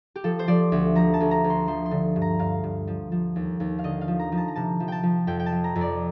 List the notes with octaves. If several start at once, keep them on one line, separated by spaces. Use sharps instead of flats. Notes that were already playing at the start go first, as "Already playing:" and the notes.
G4
F3 A4
C5
F3 D5
D2
F3 A#5
A5
D2
A#5
D2
C6
F3 C6
C6
D3
G2
A#5
G2 F5
G2
F3
F3
D#2
D#2
F5
D3 D#5
F5
F3
A#5
F3
A5
A#5
C3 A5
F3
G5 A5
F3
F2 G5
G5
A5
F3
A#5
F2
D5